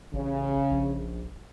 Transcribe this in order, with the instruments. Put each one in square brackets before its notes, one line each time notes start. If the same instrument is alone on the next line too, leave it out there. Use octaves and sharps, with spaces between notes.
[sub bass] A1 [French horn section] C#3
[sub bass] A#1